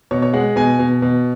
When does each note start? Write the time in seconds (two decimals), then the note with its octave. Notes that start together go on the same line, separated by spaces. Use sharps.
0.11 B2 C#5
0.22 C#5
0.34 G#3 F#5
0.56 B2 G#5
0.79 B2
1.02 B2